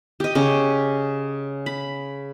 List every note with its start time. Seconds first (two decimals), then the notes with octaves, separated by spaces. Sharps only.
0.20 G4 D#5
0.35 C#3 C#4 D#5
1.66 B5